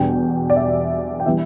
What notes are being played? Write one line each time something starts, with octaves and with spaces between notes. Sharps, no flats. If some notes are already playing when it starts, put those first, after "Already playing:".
Already playing: E2 B2 G3 D4 G5
D5
E5
G5
E3 G3 B3 E4 E5